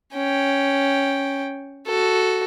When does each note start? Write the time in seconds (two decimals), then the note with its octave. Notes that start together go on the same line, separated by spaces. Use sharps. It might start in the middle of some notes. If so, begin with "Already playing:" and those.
0.14 C#4 G5
1.86 F#4 A4